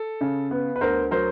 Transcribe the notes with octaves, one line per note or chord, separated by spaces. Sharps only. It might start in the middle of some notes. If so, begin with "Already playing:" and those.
Already playing: A4
C#3
B3
B4
D2 A#4 C5
F#3 A#4 C5